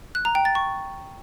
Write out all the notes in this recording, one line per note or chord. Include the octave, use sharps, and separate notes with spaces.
F#6
A#5
G5
A6
C#6